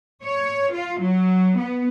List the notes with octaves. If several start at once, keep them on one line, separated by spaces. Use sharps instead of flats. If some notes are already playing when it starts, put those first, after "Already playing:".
C#5
F4
F#3
B3